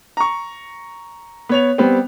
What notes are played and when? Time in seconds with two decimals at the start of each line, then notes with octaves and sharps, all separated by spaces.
0.17 A#5 C#6
1.49 B3 C#5 F7
1.78 G3 B3 C4